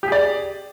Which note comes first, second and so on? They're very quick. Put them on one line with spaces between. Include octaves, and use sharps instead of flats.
G4 G#4 D5